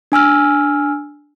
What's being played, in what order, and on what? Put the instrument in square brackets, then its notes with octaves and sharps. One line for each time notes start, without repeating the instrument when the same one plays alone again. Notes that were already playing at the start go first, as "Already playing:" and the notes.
[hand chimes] D4 G#5 E6 F6